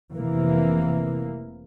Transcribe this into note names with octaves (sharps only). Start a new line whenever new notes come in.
F1 C3 E3 A#3